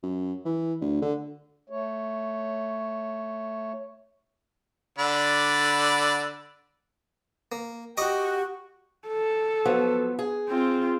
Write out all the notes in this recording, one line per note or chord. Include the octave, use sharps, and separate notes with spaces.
F#2
E3
D2
D3
A3 C#5
D3 D5 B5
A#3
F#4 G4 D#5 G5 C#6 D6
A4
F3 F#3 B3
G#4
C4 F4